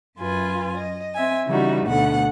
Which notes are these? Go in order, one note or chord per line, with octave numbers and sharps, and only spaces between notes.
F#2 F4 B4 G#5
D#5
C4 E5 G#5
C#3 E3 G3 D#4 F#4
D2 B2 A3 F#5